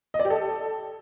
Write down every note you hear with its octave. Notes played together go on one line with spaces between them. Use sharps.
D#5
D5
G4
A4